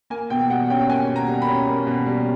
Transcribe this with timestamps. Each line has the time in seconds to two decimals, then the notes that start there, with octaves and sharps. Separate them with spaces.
0.10 A#3 G#5
0.30 B2 G5
0.50 G3 F#5
0.70 C#4 G5
0.89 A#3 G#5
1.09 B2
1.16 A#5
1.28 G3
1.42 B5
1.48 C#4
1.68 A#3
1.87 B2
2.07 G3